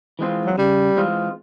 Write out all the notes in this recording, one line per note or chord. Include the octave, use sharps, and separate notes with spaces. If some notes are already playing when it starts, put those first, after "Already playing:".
E3 G#3 C4 F4
F#3
C#3 G3
E3 G#3 C4 F4